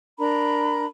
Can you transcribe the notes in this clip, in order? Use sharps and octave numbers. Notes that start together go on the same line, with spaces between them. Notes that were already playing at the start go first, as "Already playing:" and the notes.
D4 A#4 A#5 B5